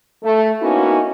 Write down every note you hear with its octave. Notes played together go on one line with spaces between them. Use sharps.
A3
A#3 B3 C#4 D#4 E4 F#4